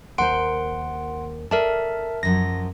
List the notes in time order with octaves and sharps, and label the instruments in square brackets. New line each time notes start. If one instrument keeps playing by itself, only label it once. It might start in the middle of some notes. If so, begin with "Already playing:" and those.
[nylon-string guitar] D#2 A#4 C5 [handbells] F#5 C6 D7
[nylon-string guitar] A4 D5 [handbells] A#4 E5 A5
[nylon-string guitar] F#2 F3 F#3 [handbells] A#6